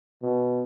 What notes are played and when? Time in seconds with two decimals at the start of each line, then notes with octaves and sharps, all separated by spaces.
0.22 B2